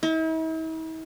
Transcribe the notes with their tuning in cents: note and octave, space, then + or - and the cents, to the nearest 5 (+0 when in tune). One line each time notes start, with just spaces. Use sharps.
E4 -45